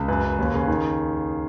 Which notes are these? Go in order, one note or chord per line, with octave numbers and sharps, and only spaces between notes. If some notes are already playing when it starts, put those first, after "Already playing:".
Already playing: C#2
F#2 B4
F#2
D#2
C#3
D#3